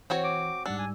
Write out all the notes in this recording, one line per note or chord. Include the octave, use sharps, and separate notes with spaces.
E3 C4 F#4 C#5
D6
G#2 G3 D4 F#5 E6
G#5